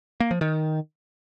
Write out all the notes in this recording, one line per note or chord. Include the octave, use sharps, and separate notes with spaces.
A#3
F3
D#3